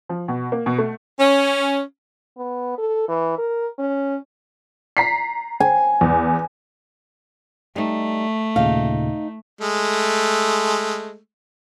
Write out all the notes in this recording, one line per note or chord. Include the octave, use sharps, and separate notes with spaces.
F3
B2
A#3
B2
A3
C#4
B3
A4
E3
A#4
C#4
A#5 B6 C7
G#5
E2
G3 A3 D#4
D#2 A#2 C#3 D#4 F5
G#3 A3